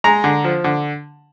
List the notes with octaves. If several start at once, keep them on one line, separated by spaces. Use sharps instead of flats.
G#3 A#5
D3
F3
D3